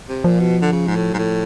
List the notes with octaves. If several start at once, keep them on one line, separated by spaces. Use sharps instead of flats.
C3
A#2 F3
B2
D3
C#3
G#2
A2
G#2 F#3
A2 F3